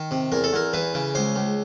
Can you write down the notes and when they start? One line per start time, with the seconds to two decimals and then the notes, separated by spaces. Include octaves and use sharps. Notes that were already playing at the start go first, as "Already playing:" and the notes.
Already playing: D#3
0.11 C3
0.32 E2 A#4
0.44 A4
0.53 E2 A#4
0.73 E3 B4
0.94 C#3
1.15 C#2 C5
1.36 C#2